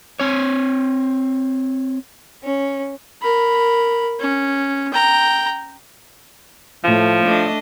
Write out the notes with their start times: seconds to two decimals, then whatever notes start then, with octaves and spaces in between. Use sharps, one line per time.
0.20 C4 C#5
2.43 C#4
3.22 A#4 B5
4.20 C#4
4.93 G5 A#5
6.84 A2 F3 A3
7.24 A3 D4 D#5